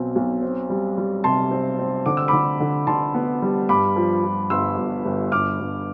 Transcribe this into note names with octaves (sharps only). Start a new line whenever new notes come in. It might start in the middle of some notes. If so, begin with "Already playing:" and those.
Already playing: B1 B2 C4
B1
C4
G3
G3
C3 A5 C6
C4
C4
D3 D6
E6
D3 B5 D6
D3
D3 A5 C6
B3
G3
G2 B5 D6
F3
F3
G1 C6 E6
G1
G1
G1 D6 F6
G1